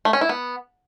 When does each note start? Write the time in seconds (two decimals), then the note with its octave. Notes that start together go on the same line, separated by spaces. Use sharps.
0.05 A3
0.13 C#4
0.21 E4
0.29 B3